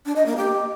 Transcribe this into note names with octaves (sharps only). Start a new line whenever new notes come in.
D4
D#5
A#3
G4